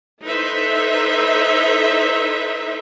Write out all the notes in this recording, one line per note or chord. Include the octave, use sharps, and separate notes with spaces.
D#4 E4 A4 B4 C5 E5